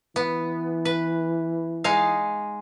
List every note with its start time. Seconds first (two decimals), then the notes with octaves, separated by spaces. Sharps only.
0.16 E3 B3
0.85 B4
1.84 G#3 D#4 F5